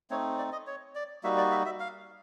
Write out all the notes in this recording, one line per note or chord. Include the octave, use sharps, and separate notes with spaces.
A3 C4 D#4 C#5
D5
D#5
C#5
D5
G3 A#3 D#4 F#4 E5
D5
E5
E5
F5